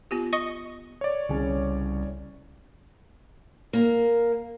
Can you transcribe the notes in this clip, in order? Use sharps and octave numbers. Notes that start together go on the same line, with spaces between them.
B3 F4 G4
D#5 C#6 D#6
C#5 D5
C2 C#3 C#4
A#3